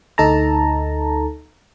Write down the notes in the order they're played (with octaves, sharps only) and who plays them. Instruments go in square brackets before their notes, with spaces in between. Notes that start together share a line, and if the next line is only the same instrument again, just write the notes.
[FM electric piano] D2 D#4 A4 A5 A#5